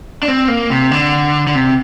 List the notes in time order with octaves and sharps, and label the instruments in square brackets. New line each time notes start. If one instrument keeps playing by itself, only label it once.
[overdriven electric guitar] D4
C4
A#3
C3
D3
D3
C3